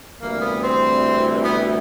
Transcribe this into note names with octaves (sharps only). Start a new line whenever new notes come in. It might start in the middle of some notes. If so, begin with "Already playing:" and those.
D2 C3 E3 G3 A#3
B3
C4
B3